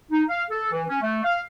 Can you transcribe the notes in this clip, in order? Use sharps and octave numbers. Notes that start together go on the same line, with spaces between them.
D#4
F5
A4
E3
C#4
A3
F5